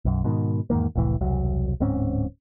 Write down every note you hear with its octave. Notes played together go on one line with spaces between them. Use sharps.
B1 F#2
G#2 B2 D#3
E2 G#2 D#3 A#3
F1 C2 A2 E3
E1 C2 F#3
D1 G#2 C4 C#4